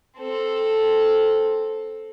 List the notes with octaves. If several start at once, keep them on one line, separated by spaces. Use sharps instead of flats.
C4 A4